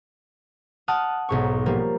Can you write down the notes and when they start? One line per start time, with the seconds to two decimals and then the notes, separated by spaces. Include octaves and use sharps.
0.88 F#5 A5 D#6 F6
1.29 B1 G#2 C#6
1.66 F3 G3 A#3